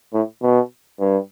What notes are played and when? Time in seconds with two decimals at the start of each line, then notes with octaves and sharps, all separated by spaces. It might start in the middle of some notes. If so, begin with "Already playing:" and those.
0.13 A2
0.42 B2
1.00 G2